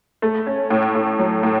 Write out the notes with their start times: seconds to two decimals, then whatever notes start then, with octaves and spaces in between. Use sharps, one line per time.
0.22 A3
0.47 C#4
0.70 A2
0.95 A2
1.19 F#3
1.43 A2